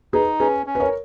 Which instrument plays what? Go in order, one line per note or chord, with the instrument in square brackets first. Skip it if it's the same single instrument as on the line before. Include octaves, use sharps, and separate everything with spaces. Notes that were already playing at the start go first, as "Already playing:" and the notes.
[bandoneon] D#4 [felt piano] G#4 B4
[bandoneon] C#4 [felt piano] G#4 B4
[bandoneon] C#4
[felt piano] B4
A#4 C#5